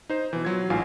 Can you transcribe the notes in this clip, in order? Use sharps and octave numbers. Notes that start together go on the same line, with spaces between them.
D#4 C5
B2 E3
F#3 F4 G#6
A1 G#2 F4 F5 G#5 C7